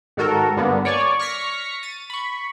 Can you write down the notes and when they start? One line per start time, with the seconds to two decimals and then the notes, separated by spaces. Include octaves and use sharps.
0.17 G#2 D#3 F#4 A4 A#4
0.57 G2 D3 A#3 B3
0.85 C#5 D5 G#5 C#6
1.19 C#6 F6 A#6 B6 C#7
1.83 A6 D#7
2.10 B5 C#6